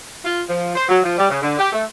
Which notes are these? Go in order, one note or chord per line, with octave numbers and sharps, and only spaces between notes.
F4
F3
C5
F#3
F3
G3
C#3
D3
G4
A3